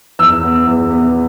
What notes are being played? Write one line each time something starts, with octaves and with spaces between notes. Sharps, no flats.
E2 E6
B3
E2
B3